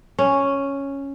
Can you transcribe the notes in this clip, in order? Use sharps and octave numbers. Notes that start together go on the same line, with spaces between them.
C#4